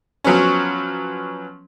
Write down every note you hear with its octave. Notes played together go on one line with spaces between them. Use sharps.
F3 F#3 B3 C#4